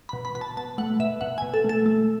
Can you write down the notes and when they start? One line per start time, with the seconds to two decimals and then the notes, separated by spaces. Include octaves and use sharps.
0.09 B2 B5
0.25 B5
0.35 B2 B5
0.41 A5
0.57 B2 A5
0.78 A3 F#5
1.00 B2 E5
1.21 B2 F#5
1.38 B2 G#5
1.54 A4
1.64 A3 A4
1.86 A3